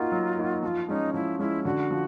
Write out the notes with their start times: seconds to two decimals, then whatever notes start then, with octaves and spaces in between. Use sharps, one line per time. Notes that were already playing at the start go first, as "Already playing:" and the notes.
Already playing: A#3 D#4 F4 F#4
0.12 F#3
0.37 A#3 D#4 F#4
0.62 F3 F4 F#4
0.88 G#3 C#4 D#4
1.14 F3 E4
1.39 G#3 C#4 E4
1.65 D3 F#4
1.91 F3